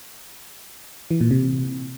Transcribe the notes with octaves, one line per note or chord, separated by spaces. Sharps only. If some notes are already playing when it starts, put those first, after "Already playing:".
E3
A#2
C3